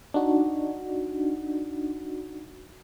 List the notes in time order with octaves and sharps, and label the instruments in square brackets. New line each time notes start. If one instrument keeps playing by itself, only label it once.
[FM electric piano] D4 D#4 F#4